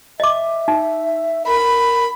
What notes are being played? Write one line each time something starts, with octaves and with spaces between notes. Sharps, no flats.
D#5 E5 D6
D#4
A#4 B5